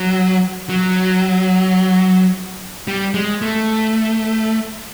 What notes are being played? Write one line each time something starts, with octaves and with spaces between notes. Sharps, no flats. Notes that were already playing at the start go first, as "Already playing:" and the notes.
Already playing: F#3
F#3
G3
G#3
A3